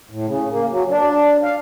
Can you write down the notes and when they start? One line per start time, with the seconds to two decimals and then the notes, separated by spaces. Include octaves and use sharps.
0.10 A2
0.26 C#3
0.50 A#3
0.70 F#3
0.89 D4
1.43 F5